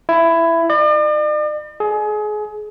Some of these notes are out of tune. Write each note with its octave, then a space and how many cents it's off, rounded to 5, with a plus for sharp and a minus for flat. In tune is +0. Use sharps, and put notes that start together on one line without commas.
E4 +15
D5 +45
G#4 +30